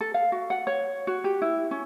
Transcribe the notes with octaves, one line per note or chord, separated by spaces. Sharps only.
A4
F5
F#4
F#5
C#5
F#4
G4
E4
C#4